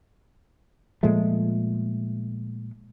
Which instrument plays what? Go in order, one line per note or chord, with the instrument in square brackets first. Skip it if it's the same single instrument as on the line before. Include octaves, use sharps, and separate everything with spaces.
[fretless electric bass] A#2 F3 G#3 A3